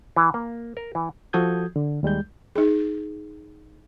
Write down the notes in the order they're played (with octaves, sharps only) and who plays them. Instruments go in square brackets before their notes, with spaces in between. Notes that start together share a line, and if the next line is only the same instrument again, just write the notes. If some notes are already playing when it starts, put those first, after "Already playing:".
[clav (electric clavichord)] E3
A#3
A#4
E3
[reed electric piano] F3 F#4 A4 D#6 G6 G#6
D3
D#2 G3 G#3 G6
[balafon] D#4 G#4